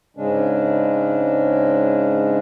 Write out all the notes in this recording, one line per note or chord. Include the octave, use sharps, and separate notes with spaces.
G#2 C#3 G#3 C#4 D4